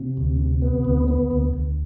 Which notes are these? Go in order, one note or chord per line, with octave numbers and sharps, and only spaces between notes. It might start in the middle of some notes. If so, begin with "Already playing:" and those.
Already playing: C3
D2
C3
B3
D2
B3
D2
D2